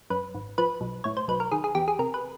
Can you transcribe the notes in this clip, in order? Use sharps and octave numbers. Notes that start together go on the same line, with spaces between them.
F#2 B4
G#1
F3 B4
B1
A2 C#5
C5
B1 B4
A#4
D#3 G#4
G#4
E2 G4
G#4
C3 A#4
B4